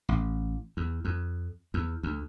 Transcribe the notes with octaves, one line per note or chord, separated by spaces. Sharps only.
A1
E2
F2
E2
D2